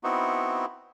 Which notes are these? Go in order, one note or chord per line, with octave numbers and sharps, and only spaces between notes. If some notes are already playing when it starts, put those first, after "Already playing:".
B3 C4 D#4 E4 F#4